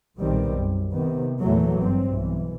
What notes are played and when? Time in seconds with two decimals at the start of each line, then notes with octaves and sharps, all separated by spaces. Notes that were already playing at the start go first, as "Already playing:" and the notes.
0.19 B1 A#2 D#3 G3 C4
0.53 F#2
0.92 C3 D#3 B3
1.41 E2 A#2 E3 F#3 A3
1.77 G#1 G2 C4
2.10 B1 E3